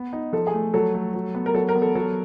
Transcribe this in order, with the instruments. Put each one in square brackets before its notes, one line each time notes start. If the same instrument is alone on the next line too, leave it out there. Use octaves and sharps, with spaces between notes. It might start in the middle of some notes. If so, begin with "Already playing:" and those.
Already playing: [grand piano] B3
D#4
[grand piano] F3 [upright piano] A4
[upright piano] G#4
[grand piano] A3
[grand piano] F#3 [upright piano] A4
[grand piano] A3
F#3
B3
[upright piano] A#4
[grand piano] F#3 [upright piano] A4
[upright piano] A#4
[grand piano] B3
[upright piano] A4
[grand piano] F#3 [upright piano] A4